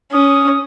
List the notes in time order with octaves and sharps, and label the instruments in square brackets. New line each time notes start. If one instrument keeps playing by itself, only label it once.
[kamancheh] C#4 [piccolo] D#6